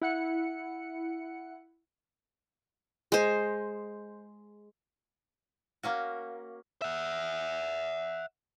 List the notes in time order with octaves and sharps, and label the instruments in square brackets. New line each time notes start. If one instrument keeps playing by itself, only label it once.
[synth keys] E4 F#5 C#7
[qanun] G#3 C5
[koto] A#3 C#4 F#4
[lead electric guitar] E5 F#5